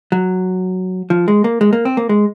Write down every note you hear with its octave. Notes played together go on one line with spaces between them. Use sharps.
F#3
F3
G#3
A#3
G#3
A#3
C4
A#3
G#3